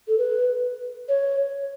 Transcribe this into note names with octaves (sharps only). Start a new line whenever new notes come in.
A4
B4
C#5